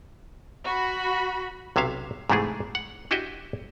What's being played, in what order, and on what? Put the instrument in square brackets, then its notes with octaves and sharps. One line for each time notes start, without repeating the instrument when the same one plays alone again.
[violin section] F#4 B5
[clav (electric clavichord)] B1 C3 C#4 E5 F5
G#2 C3 E3 A3 E4 G#4
F#5
D4 E4 F#4 G4 D#5 E5